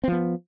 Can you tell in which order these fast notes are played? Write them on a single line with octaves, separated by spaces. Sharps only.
C4 F3 B3